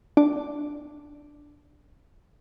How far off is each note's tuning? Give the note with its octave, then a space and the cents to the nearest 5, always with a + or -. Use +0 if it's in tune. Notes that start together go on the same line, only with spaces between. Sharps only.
D4 +0 D6 +0